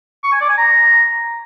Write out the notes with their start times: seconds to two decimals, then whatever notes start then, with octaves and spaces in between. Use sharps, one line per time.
0.24 C#6
0.32 G#5
0.41 D5
0.49 G#5
0.57 A#5